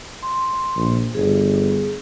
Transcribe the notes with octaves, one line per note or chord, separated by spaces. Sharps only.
C6
A#1
G1 G#4